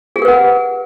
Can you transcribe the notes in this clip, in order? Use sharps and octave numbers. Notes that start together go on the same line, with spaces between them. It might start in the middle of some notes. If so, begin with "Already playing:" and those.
G4 G#4 A#4 B4 F#5